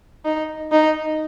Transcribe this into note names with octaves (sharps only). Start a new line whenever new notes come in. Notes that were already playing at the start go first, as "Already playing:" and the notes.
D#4
D#4